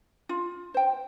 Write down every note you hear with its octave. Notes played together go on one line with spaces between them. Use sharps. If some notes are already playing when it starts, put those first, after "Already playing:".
F4
C5 G5